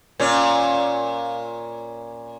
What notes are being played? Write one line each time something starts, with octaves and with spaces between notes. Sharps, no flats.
A#2 C#4